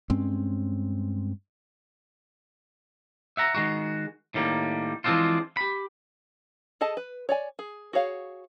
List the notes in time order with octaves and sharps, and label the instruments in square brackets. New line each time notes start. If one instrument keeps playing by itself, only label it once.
[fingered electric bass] G2 G#3 C4 C#4
[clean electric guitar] E5 F#5 A#5
D#3 G#3 F#4
A2 D#3 G3 A#3
E3 F3 G#3 C4 D4 F4
G4 B5
[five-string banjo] G#4 A4 D#5 A5
B4
C#5 D5 G#5
G#4
F#4 G#4 C#5 F5